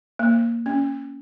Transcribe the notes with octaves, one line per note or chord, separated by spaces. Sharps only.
A#3
C#4